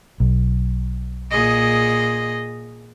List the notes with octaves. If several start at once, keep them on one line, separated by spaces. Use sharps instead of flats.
B1
A#2 G#4 D#5